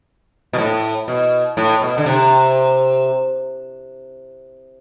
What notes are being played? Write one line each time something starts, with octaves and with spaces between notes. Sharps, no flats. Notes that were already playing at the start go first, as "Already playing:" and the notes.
B2
A2
B2
A2
B2
D3
C3